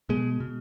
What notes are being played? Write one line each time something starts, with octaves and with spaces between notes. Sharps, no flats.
B2 G#3
B2